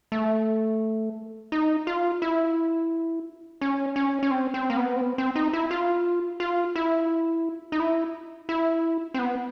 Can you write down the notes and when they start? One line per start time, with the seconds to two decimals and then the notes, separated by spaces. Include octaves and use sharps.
0.12 A3
1.52 D#4
1.87 F4
2.22 E4
3.61 C#4
3.96 C#4
4.23 C#4
4.31 C4
4.54 C4
4.70 A#3
4.77 B3
4.96 C4
5.01 B3
5.18 C4
5.36 D#4
5.53 E4
5.71 F4
6.40 F4
6.76 E4
7.72 D#4
7.80 E4
8.49 E4
9.14 C4
9.19 B3